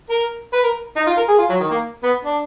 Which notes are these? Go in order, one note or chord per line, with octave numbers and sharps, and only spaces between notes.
A#4
B4
A#4
D#4
F4
A#4
G#4
F4
F#3
D#3
A#3
B3
D4